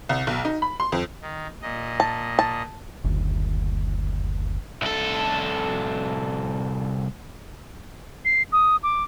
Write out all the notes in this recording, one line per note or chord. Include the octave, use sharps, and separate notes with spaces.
C2
B1
D#4
B5
C6
F2
D#3
A#2 D#5
A5
A5
F#1 D2
C2 A4
C7
D#6
D6